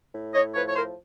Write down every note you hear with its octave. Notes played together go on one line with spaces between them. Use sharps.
A2
C#5 D#5
F3 B4 C#5
C#5
A#4 C5